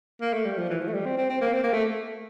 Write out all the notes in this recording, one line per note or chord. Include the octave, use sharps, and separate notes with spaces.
A#3
A3
G3
F3
E3
F3
A3
G3
C4
C4
C4
A#3
C4
A#3
A3